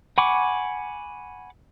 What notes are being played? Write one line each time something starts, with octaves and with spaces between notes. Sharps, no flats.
F#5 G#5 B5 C#6 D6